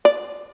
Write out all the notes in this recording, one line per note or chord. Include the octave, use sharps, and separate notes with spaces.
D5